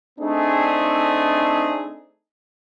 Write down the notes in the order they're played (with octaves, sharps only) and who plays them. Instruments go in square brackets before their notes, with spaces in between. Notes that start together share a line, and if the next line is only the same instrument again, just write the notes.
[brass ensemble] A3 C4 D4 D#4 G#4